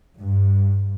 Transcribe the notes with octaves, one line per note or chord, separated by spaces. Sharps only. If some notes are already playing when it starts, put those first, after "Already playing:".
G2